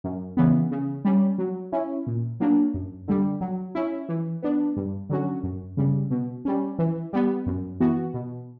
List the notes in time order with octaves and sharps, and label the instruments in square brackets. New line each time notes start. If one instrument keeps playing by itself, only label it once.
[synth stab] F#2
C#3 E3 B3
C#3
G3 C#4
F#3
C#4 E4
A#2
F#3 A#3 D4
F#2
D3 G3
F#3
C#4 E4
E3
B3 D4
G2
D3 F#3 C#4 F#4
F#2
C#3 G3
B2
G3 C#4
E3
G3 B3
F#2
E3 B3 F#4
B2